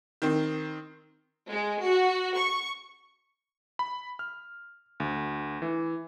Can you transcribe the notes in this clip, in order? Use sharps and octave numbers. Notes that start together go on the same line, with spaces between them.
D#3 C4
G#3
F#4
C#6
B5
F6
D2
E3